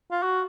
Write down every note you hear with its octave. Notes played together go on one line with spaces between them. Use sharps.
F4
F#4